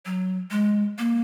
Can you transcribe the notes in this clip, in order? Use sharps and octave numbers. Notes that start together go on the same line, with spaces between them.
F#3
G#3
A#3